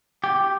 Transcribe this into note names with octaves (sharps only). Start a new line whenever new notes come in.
G4